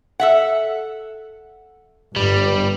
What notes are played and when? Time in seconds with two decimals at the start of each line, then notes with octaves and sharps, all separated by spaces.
0.20 A4 E5 F#5
2.16 G1 G3